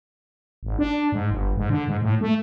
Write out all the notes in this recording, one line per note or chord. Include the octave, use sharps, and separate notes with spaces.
G#1
D4
G#2
G1
G#2
D3
G#2
A2
A3